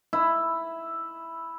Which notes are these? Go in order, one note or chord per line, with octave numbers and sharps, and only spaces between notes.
E4